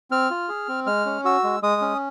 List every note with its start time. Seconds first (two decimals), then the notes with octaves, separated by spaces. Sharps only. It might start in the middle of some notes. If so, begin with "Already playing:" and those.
0.11 C4 F6
0.31 F4
0.49 G#4
0.68 C4
0.86 G#3 F6
1.06 C#4
1.25 F#4 E6
1.44 G#3
1.63 G#3 D#6
1.82 C#4